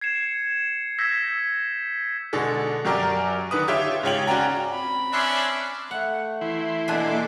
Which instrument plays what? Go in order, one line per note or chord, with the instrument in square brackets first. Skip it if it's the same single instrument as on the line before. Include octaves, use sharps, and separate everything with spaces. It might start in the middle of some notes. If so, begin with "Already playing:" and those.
[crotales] G#6 C7 C#7 E7
E6 G6 G#6 A#6 B6
[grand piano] B2 D3 G#3 D4 A4
F#2 F#3 G4 A#4 D5 A#5
D3 D#3 B4 D#6
F4 G4 C#5 E5 G5
G#2 C#3 F4 C#5 G5 F#7
C#4 F#4 D5 G5 A#5
[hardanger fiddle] C4 B5
[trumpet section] C#4 D4 C6 [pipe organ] E5 F#6
[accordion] A3 [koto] F#5
[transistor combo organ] E3 E4 C6
[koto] B2 D4 G#4 [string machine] A#3 A4 D6